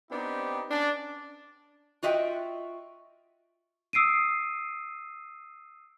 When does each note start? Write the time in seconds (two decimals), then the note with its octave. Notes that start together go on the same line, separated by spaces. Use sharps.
0.11 B3 C4 D4 D#4 G4
0.69 C#4 D4
2.03 F4 F#4 D#5 E5 G5
3.93 D#6 E6 C7 D7 D#7